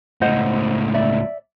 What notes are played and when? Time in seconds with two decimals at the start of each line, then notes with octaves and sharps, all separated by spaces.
0.21 C#2 A2 C5 D#5 F#5
0.94 D5 E5